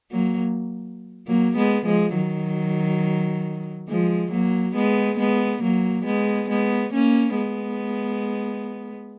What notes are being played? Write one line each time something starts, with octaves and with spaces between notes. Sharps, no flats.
F#3 A#3
F#3 A#3
G#3 B3
F3 G#3
D#3 F#3
F3 G#3
F#3 A#3
G#3 B3
G#3 B3
F#3 A#3
G#3 B3
G#3 B3
A#3 C#4
G#3 B3